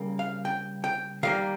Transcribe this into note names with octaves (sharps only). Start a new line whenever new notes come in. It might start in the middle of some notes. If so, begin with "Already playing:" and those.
Already playing: C#3 G3 A#3
F5
G5
G5
D#3 G3 A#3 F5